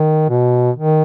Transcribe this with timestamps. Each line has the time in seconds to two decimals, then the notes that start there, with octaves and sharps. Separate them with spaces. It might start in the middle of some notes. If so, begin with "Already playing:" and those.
Already playing: D#3
0.29 B2
0.76 D#3